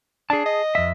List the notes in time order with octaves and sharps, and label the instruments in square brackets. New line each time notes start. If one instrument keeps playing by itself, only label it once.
[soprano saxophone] D4 [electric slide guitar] G#4 A5
[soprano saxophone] D#5
[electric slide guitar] F2 E5